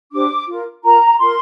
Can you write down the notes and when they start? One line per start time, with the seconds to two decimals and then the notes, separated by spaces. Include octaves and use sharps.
0.12 D4 G4 C5 D6
0.47 F4 A#4
0.83 F4 A#4 A#5
1.18 F4 A#4 C6